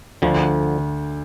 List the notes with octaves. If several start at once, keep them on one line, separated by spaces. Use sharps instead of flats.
D2 D3 F3